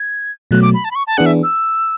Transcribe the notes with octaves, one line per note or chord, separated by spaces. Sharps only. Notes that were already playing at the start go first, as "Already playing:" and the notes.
Already playing: G#6
B2 F#3 A3 F#6
D6
B5
A5
B5
C#6
A5
E3 B3 D4 G#4 F#5
E5
E6